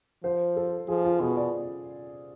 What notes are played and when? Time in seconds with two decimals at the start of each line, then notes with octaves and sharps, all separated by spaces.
0.24 F3 C5
0.56 A4
0.88 F3 G#4
1.05 F4
1.20 B2 G#4
1.36 D5